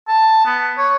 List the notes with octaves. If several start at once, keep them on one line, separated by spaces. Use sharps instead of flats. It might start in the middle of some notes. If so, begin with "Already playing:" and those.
A5
B3
C#5